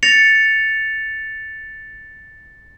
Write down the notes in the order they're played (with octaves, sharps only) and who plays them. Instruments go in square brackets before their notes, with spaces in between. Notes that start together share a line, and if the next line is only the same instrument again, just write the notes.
[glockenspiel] A6 A#6 C#7 F7